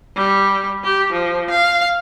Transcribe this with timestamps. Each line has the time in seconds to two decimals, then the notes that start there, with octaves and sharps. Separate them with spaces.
0.16 G3
0.84 G4
1.13 F3
1.50 F5